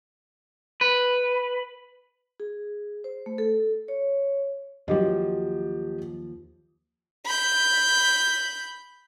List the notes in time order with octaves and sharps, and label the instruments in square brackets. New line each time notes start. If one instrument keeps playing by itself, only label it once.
[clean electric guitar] B4
[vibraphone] G#4
C5
A3
A4
C#5
[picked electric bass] D#2 F3 [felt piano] F#3 G4 D#5
[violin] B5 G6